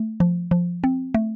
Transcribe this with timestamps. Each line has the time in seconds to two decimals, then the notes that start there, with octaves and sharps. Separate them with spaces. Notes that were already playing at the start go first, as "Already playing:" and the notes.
Already playing: A3
0.20 F3
0.51 F3
0.84 C4
1.14 A3